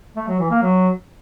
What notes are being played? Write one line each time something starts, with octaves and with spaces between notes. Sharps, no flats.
A3
F#3
E3
A#3
F#3